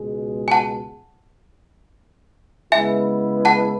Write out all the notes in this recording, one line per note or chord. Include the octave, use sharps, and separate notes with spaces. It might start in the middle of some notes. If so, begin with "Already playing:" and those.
Already playing: C#2 B2 G#3
G#5
F#5 A5
C#3 G#3 B3 E4 E5 G#5
F#5 A5